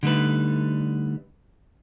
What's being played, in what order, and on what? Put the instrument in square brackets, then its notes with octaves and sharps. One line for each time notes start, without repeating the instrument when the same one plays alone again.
[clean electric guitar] D3 G3 A3 D#4 B4